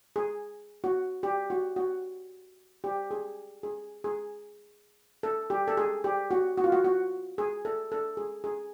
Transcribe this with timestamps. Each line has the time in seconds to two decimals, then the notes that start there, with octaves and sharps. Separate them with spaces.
0.16 G#4
0.84 F#4
1.23 G4
1.50 F#4
1.76 F#4
2.84 G4
3.11 G#4
3.63 G#4
4.04 G#4
5.23 A4
5.50 G4
5.68 A4
5.77 G#4
6.04 G4
6.31 F#4
6.58 F#4
6.64 F4
6.72 F#4
6.85 F#4
7.38 G#4
7.65 A4
7.92 A4
8.17 G#4
8.44 G#4